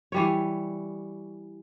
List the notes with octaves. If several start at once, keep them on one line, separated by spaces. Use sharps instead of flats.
E3 G3 C#5